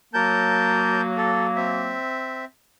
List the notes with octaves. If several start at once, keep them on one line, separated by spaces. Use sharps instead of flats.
F#3 A#3 A#4 A5 G6
A4
C4 E5